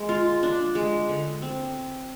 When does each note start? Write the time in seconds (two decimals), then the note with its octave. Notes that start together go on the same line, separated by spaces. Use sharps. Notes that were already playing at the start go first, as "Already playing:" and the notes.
Already playing: G#3
0.09 F4
0.43 D4
0.75 G#3
1.09 D3
1.42 C4